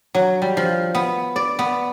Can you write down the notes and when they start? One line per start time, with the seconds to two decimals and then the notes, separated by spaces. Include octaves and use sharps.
0.15 F#3
0.42 G3
0.57 F3
0.95 B3
1.36 D5
1.59 B3